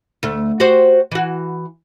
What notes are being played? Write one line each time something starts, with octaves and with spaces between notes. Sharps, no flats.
D2 A3
F#4 G4 C5
E3 F#4